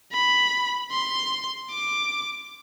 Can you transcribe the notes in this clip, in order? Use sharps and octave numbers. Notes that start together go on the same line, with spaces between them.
B5
C6
D6